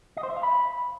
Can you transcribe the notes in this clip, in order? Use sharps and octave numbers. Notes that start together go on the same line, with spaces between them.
D#5
C5
E5
F5
B5